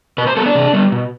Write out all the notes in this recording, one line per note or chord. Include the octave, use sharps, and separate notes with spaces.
B2 B4
C5
B3 A4
D4
C3
G3 B3
B2